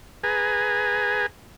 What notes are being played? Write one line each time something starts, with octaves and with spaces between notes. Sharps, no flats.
G#4 B4 G#5 A#5